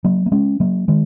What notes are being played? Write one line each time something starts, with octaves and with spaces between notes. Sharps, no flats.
F#3 A#3
A#3
G#3 C#4
F#3 A#3
D#3 G#3